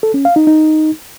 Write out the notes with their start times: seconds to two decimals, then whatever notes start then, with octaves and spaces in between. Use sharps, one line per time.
0.03 A4
0.14 C#4
0.25 F5
0.36 D#4
0.47 D#4